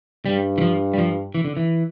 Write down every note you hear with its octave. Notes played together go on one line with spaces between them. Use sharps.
G2 G3
E3
F3
G3
F3
E3
D3
E3